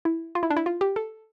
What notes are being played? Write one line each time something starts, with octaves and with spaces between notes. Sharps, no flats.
E4
F4
E4
D4
E4
F4
G4
A4